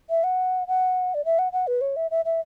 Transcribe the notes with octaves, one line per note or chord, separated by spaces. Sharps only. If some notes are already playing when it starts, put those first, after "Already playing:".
E5
F#5
F#5
D5
E5
F#5
F#5
B4
C#5
E5
E5
E5